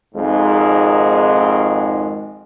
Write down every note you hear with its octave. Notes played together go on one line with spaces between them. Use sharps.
G#1 F2 G#2 D#3 G#3